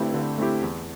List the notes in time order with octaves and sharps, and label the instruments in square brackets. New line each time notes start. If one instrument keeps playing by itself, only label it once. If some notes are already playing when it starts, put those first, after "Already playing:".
Already playing: [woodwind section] G2 [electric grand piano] D3 A3 C4 E4 G4
[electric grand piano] D3
A3 C4 E4 G4
E2